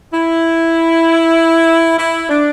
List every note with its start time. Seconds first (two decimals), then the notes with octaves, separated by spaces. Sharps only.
0.14 E4
1.98 E4
2.30 D4